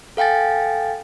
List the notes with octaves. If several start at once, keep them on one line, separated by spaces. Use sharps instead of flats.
A4 F5 G5 G#5 A6